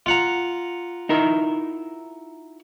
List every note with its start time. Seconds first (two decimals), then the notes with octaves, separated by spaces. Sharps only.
0.06 F4 F#5 A#5
1.09 D#4 E4 A#4